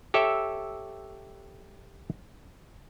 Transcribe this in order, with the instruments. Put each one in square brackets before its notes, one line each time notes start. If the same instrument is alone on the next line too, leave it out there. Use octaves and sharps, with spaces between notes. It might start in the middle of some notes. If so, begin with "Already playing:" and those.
[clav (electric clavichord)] G4 A4 C#5 E5